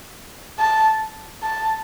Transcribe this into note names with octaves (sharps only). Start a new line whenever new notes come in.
A5
A5